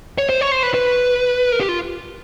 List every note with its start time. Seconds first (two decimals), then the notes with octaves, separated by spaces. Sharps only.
0.18 C#5
0.29 C5
0.41 C#5
0.52 C5
0.63 B4
0.74 B4
1.52 A#4
1.60 G4
1.69 F4